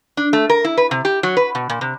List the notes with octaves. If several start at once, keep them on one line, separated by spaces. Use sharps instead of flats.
D4
A3
A#4
E4
B4
C3
G4
F#3
B4
B2
A#2
C3